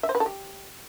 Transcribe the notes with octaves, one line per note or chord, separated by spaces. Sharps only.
E5
C5
B4
A4
G4